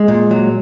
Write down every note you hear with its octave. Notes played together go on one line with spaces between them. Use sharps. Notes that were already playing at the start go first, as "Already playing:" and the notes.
Already playing: G#3
A#2
F#3